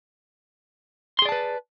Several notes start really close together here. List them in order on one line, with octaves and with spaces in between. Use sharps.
C6 G#4 D5 A5 B4